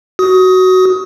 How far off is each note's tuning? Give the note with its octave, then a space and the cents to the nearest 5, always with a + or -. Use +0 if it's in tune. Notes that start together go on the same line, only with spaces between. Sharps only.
F#4 +10 D#6 +20